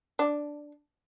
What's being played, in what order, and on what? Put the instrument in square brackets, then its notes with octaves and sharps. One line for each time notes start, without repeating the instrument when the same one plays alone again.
[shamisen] D4